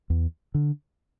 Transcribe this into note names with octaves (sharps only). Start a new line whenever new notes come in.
E2
D3